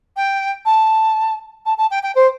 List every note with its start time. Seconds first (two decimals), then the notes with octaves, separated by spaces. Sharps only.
0.16 G5
0.65 A5
1.66 A5
1.78 A5
1.91 G5
2.03 G5
2.15 C5